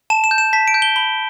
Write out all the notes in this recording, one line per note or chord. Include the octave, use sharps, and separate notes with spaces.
A5 E7
E7
G6
E7
A5 B6
D7
G6
G7
B5 G7